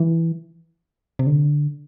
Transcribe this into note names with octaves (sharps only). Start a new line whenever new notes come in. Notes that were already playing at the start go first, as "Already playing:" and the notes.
Already playing: E3
C3
D3